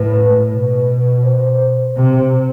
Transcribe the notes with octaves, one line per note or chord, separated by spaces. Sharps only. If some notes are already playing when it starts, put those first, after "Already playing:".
Already playing: A2 B4
B2 B4
C5
C3 C5